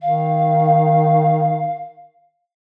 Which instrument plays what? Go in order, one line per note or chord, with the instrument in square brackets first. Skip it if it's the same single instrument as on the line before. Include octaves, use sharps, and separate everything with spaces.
[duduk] D#3 [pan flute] F5